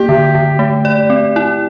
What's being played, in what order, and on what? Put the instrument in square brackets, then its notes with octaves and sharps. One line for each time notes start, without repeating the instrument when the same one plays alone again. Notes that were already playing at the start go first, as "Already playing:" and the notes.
Already playing: [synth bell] A#3 [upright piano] G4
[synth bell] D3
D3
A3
D5
C4
E4